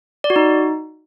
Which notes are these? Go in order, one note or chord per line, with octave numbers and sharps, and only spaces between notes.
D5
F#4
D#4